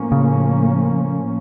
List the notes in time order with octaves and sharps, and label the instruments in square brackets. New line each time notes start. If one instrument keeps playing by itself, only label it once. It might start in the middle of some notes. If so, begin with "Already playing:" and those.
Already playing: [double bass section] A2 F3 A#3 C#4
[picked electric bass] C#3